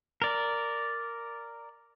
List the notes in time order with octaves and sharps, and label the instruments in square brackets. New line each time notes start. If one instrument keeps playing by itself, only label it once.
[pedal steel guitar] A#4 D5